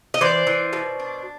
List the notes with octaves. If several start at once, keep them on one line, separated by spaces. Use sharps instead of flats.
D#5
E3 C5 D5
E3
B2
D4